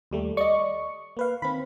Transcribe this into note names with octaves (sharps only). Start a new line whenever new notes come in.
D#2 G3 A3
D5 D#5 C#6
A#3 B4 F5
D#3 C4 B5